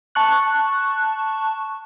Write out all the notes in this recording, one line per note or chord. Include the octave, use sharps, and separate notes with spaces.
A5 C#6 F#6